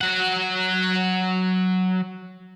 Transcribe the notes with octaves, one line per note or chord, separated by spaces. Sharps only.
F#3 F#5